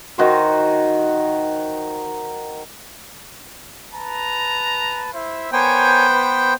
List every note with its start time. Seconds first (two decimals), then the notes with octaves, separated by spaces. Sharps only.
0.18 D#3 D#4 F#4 C5
3.94 B4 A5 A#5
5.14 E4 C5 E5
5.52 B3 A#4 C5 C#5 G5 G#5
6.10 B4